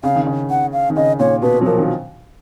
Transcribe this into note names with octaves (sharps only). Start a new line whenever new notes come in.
C#3 F5
D#3
C#3
F#5
F5
D#3
C#3 D#5
A#2 C#5
B2 B4
F#3
F3 A#4
D#3